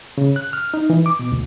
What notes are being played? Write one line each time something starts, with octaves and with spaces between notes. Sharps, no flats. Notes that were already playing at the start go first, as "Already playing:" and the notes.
C#3
F#6
F6
D#4
E3
D6
B2
D2